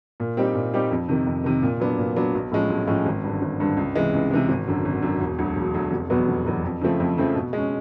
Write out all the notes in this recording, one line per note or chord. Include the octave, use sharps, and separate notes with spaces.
A#2
G3 C4 D#4 G4
A#2
G3 C4 D#4 G4
F2
C3 D#3
F2
C3 D#3
A#2
F#3 B3 D4
A#2
F#3 B3 D4
B1
A2 F3 G#3 C#4
B1
A2 F3 G#3 C#4
G#1
G2 D3
G#1
G2 D3
C#2
C3 E3 G#3
C#2
C3 E3 G#3
G#1
F#2 D3
G#1
F#2 D3
E1
D2 D3 F#3
E1
D2 D3 F#3
F1
E2 B2 F#3 B3
F1
E2 B2 F#3 B3
F2
C#3 F3 A3 C4
F2
C#3 F3 A3 C4
B2
G#3
C#4